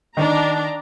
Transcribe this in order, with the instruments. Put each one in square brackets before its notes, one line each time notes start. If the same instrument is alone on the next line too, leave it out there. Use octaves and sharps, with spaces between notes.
[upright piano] D#3 [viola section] D4 D5 A#5